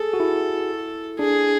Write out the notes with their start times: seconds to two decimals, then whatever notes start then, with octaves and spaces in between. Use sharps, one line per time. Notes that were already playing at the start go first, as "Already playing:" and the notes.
Already playing: G#4 A4
0.14 F#4
0.20 E4
1.19 D4 G#4